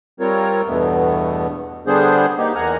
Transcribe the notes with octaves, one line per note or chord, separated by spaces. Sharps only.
G3 C4 F4 A#4 C#5
E2 G2 B2 A3 B3
D3 G3 B3 D4 G#4 C5
A#3 D#4 G4
E2 A#3 F#5 G#5 A#5 F6